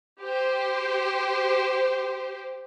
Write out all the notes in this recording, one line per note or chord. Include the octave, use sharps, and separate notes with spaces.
G4 C5